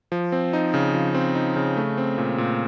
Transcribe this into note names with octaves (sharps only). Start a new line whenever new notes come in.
F3
C4
D#4
C#3
F3
C4
D#4
C#3
A3
C4
A#2
A#2